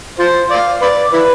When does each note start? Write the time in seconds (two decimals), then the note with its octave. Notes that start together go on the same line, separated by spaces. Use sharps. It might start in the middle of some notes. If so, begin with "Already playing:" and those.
0.19 F4 C5
0.51 D5 F5
0.82 B4 D5
1.13 E4 B4